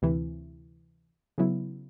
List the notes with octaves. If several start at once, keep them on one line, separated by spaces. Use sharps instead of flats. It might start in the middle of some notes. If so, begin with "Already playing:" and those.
D2 C3 E3
C#3 F#3 B3 E4